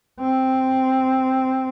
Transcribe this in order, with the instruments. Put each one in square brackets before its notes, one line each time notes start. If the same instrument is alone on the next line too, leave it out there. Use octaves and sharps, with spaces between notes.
[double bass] C4